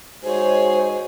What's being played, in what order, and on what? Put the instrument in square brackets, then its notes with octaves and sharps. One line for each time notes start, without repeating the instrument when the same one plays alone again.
[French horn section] G#3 D#4 F#4 [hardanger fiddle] G#4 C#5 [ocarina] C5